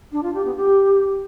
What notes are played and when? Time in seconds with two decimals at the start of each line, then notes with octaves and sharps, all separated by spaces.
0.12 D4
0.23 F4
0.34 G4
0.45 B3
0.56 G4